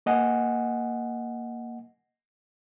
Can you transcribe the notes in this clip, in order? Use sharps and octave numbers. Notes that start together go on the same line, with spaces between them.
A#3 D#5 F#5 G#5